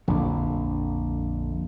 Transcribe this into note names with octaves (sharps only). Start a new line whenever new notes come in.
A#1 F2 D3